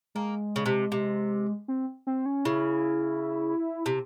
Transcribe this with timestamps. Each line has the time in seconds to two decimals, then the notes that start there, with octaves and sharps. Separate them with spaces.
0.15 G#3 A#3
0.56 C#3
0.66 C3
0.92 C3
1.68 C4
2.07 C4
2.26 C#4
2.45 C#3 E4
3.86 C3